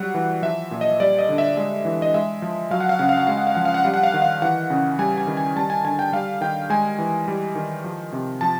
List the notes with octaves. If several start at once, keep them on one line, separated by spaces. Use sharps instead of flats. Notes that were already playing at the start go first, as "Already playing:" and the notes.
Already playing: F#3 G3 F#5
E3
F3 E5
A#2
D#5
G3 D5
D#5
D3
E5
G#3
E3
D#5
G#3 E5
F3
F#3 F5
F#5
F5
C#3 F#5
F5
F#5
G#3 F5
F#5
F5
F3 F#5
F5
F#5
G3 F5
F#5
F5
D#3 F#5
F5
E3 F#5
C#3
G3 G#5
G#5
D#3
G#5
G3 A5
G#5
D3 G#5
G5
G3 F5
D#3 G5
G#3 G#5
E3
G3
D#3
F3
C3
F3 A5